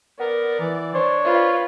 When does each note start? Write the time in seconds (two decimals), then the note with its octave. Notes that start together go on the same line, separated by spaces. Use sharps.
0.20 B3 A#4 D5
0.60 E3
0.94 D4 C5 C#5
1.25 F4 B4 C5